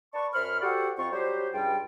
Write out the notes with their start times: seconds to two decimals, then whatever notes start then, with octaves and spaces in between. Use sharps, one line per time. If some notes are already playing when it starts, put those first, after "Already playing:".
0.14 B4 D5 A5 C#6
0.33 F#2 C5 B5 C#6 F6
0.61 F#4 G4 A4 C5 D5 F#5
0.97 F2 C4 F4 C#6
1.11 F#3 G3 G4 C5
1.53 C#2 G2 G3 F4 G5